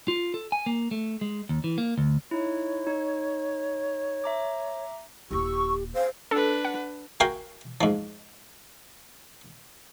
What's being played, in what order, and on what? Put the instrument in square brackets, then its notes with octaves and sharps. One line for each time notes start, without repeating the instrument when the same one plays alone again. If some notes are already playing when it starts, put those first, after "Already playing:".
[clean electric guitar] F4
A4
G#5
A#3
A3
G#3
D#2
E3
A#3
D2
[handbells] D#4 E4 [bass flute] C#5
[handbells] D#4
E5 A#5 D6
[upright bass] D#1 E4 [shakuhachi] G4 [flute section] C#6 E6
[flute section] G#4 F5 [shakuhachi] C5
[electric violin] D4 B4 [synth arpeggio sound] A4
[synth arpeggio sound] F#5
[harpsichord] F#4 A#4 F5 G5 G#5 C6
G#2 F3